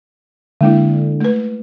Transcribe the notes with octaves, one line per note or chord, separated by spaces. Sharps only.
D3 G#3 A#3 E4
A3 B4